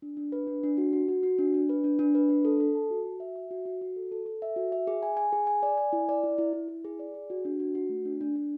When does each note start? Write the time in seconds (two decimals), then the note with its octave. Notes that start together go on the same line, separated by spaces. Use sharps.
0.02 D4
0.17 D4
0.32 B4
0.47 D4
0.63 D4
0.78 F#4
0.93 F#4
1.09 F#4
1.23 F#4
1.39 D4
1.54 D4
1.69 B4
1.84 D4
1.99 D4
2.15 B4
2.29 D4
2.45 A4
2.60 A4
2.75 A5
2.90 F#4
3.06 F#4
3.20 E5
3.36 E5
3.51 F#4
3.66 F#4
3.81 F#4
3.96 A4
4.12 A4
4.26 A4
4.42 E5
4.56 F#4
4.72 E5
4.87 G#4
5.03 G#5
5.17 G#5
5.32 G#4
5.47 G#5
5.63 D5
5.78 G#5
5.93 E4
6.09 D5
6.24 E4
6.38 E4
6.53 E4
6.68 E4
6.85 G#4
6.99 D5
7.14 G#4
7.30 F#4
7.45 D4
7.60 F#4
7.75 F#4
7.89 A3
8.05 D4
8.21 D4
8.36 D4